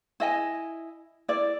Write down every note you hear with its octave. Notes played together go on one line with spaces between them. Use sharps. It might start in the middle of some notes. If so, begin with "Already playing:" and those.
E4 D#5 G#5
E4 D5